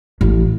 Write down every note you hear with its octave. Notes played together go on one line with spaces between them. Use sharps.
A1